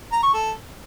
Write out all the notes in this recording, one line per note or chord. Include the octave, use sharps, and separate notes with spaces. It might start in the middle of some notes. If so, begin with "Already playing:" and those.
A#5
C#6
A4